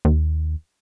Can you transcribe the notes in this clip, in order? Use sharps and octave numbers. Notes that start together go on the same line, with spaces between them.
D#2